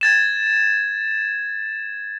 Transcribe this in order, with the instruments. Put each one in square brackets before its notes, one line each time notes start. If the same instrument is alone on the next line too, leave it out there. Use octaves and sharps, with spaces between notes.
[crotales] G#6 A6 E7